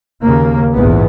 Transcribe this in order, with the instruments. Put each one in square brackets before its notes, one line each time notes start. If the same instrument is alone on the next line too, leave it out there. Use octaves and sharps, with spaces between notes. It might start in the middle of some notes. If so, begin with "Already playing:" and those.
[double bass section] D#2 C#3 A#3
A#1 E2 G#2 G#3 B3